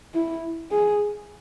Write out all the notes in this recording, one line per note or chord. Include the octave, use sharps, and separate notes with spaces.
E4
G#4